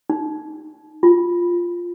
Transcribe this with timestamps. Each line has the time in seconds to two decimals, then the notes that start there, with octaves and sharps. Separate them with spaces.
0.10 D#4
1.03 F4